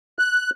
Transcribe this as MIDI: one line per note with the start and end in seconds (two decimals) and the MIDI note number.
0.19 0.50 90